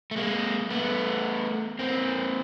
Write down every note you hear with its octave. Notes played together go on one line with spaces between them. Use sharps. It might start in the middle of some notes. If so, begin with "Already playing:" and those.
A3
G#3 A#3
A3 B3
A#3 C4